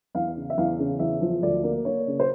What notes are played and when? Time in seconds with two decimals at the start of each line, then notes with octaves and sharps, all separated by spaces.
0.15 E2 F5
0.36 C#3
0.50 E5
0.57 E2 F5
0.79 C#3
0.99 E2 E5
1.21 F3
1.42 D2 D5
1.63 A#3
1.85 A#3 C#5
2.07 C#3
2.20 C5